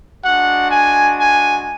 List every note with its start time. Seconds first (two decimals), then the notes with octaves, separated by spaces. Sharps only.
0.24 G#3 D4 F#4 F#5
0.71 G#5
1.18 G#5